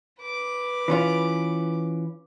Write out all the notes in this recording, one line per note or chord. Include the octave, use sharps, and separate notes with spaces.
B4 D6
E3 C#4 F4